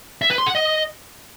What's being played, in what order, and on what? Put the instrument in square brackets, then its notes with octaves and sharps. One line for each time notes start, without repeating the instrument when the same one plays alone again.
[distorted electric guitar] E5
B4
C6
F#5
D#5